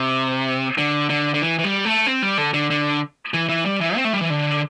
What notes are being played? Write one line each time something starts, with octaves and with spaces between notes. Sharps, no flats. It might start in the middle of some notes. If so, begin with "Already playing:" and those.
Already playing: C3
D3
D3
D3
E3
E3
G3
A3
C4
G3
D3
D3
D3
E3
E3
G3
E3
C4
A3
G3
E3
D3